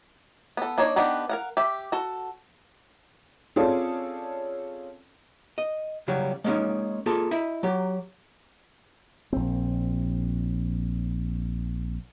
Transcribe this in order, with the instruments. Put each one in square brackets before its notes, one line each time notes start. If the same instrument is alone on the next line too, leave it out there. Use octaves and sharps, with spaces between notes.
[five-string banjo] B3 A4
A#3 D4 D#4 C#5
D#3 B3 D4 G4 F#5
A#4 F5 F#5
G4 E5
F#4 A4
[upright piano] C4 C#4 F4 G#4 A4 D5
[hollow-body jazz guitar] D#5
C#3 F#3 G3
G#3 A#3 C#4 D#4
A#3 F4 G#4 A4
E4 D#5 E5
F#3 G4
[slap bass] A#1 C4